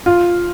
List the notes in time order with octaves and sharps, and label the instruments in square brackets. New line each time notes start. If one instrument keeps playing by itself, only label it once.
[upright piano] F4